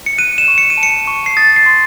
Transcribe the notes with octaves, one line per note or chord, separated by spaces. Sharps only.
C#7
F#6 D#7
E7
C#6
C#7
D#7
A5
C#7
C#6
C7
D#6 A6
C7
C6